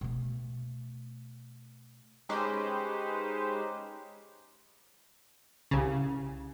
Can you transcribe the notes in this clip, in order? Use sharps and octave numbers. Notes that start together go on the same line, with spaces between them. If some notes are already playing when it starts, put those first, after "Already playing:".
B2 A3
G#3 C#4 D#4 G4 B4 C5
C2 C#3